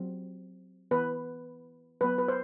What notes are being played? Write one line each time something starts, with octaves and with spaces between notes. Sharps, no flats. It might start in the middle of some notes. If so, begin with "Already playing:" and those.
Already playing: F#3 C4
E3 B3 B4
F#3 B3 B4
B4
C5